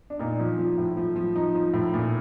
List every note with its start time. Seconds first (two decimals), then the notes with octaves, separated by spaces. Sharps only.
0.10 D4
0.19 A#2 D#4
0.39 F3
0.59 F3
0.78 A2
0.97 F3
1.16 F3
1.35 F3 D#4
1.55 F3
1.73 A2
1.94 A#2